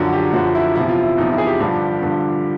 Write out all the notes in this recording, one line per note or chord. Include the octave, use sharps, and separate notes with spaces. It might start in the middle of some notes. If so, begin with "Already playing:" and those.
Already playing: F#2 D3 F3 F#4
G4
F#2 D3 F3 F#4
E4
E2 C3 F3 E4
F4
E4
E2 C3 F3 D#4
E4
G#4
G4
G2 D3 F3
G2 D3 F3